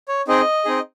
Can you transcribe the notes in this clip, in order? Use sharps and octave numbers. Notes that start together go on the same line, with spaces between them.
C#5
C4 D#4 G#4 D#5
C4 D#4 G#4